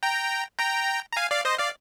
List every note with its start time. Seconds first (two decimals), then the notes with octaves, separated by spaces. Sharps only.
0.03 G5 A#5
0.59 G5 A#5
1.12 A#5
1.16 F5 G#5
1.31 D5 F5
1.45 C5 D#5
1.58 D5 F5